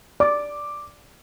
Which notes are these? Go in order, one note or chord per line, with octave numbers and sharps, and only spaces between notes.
D5 D6